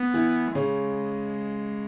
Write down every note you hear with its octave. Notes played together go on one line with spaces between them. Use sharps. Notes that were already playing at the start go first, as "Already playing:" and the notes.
Already playing: B3
E3 E4
C#3 G#3 C#4